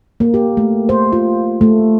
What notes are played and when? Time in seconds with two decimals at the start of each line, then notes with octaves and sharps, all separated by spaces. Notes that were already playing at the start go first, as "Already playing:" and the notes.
0.20 A#3
0.34 G4
0.57 A3
0.89 C5
1.13 F4
1.61 A3